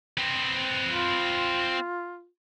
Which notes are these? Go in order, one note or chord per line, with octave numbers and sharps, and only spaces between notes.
C4 B4
F4